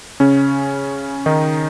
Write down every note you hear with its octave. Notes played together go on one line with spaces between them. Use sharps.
C#3 C#4
D#3 D#4